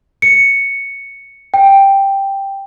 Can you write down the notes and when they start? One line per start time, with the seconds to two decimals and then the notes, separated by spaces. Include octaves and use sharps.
0.22 C#7
1.54 G5